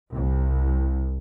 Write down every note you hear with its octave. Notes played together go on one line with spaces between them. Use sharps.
C2